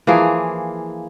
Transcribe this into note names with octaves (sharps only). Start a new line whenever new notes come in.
E3 F3 A#3 G#4